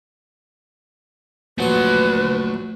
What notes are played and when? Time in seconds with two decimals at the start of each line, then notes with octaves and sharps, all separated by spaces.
1.59 A#1 F#3 A3 B4 F#5 C6